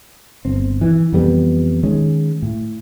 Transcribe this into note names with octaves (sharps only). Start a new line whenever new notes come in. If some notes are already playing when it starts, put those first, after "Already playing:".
G1 C4
E3
F2 E3 G3 B3
D#3 G#3 C#4
A2